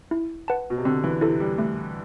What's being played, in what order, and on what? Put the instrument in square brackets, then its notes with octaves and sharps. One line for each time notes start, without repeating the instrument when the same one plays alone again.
[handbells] E4
B4 F#5 A5
[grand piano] B2
C3
[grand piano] D3 [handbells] C4
[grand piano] E3
[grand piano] C3 [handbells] E4 A4
[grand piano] G3
[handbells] A3